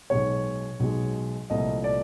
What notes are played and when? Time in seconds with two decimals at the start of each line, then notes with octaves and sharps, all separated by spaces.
0.10 B1 B2 G#3 C#5
0.80 B1 B2 G#3
1.50 C2 A#2 F3 A3 D#5
1.84 D5